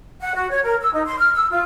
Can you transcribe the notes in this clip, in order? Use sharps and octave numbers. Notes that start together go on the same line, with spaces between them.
F#5
F#4
C#5
A#4
E6
D#4
C6
F6
E6
F4